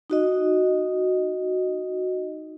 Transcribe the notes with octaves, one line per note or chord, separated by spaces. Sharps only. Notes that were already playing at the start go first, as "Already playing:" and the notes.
D#4 F#4 D#5